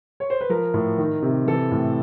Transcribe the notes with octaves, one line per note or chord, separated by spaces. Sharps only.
C#5
C5
B4
F3 A#4
A2
D#3
C3
E3 A4
A2